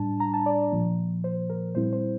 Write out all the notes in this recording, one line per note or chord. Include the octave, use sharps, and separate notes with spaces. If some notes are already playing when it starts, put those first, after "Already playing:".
Already playing: A2 G3 D4 A5
A#5
A5
D5
A#2 F3 A#3
C5
A#4
A#2 G3 C4 E4 C5
C5